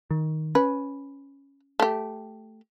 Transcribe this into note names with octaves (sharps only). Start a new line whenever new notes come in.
D#3
C#4 B4
A3 G4